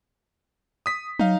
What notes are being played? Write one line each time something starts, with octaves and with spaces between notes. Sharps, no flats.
D#6 B6
F#3 D#4 F5